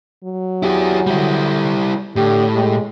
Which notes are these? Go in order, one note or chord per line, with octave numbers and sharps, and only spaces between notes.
F#3
E4 G4 G#4
D3 G3 E4
A2 D3 G4
G#3 G4